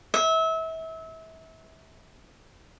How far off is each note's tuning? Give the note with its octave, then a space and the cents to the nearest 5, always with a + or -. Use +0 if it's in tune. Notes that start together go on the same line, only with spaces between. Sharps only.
E5 -30